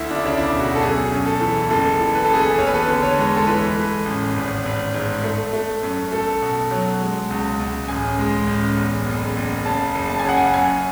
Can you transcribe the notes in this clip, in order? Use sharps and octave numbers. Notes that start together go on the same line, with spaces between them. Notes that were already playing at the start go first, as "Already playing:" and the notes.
Already playing: D2 E4
D4
E4
C#3 D4
E4
E1
F#4
A4
F#2 G#4
F#2
A4
E3
F#1 A4
E3
B4
A4
F#1 G#4
A4
E2 C#5
B4
A4
B4
D3
C#5
G#3
A4
E3 B4
A3
A1
G#1
G#1
G#2
A3
A3
F#2
A3 A4
B2
F#3
G#3
C#2
C#2
A1 G#5
G#3
A1
E2
F#1
F#1
C#3 A5
F#1
A5
G#5
C#3 F#5
G#5
F#2 G#5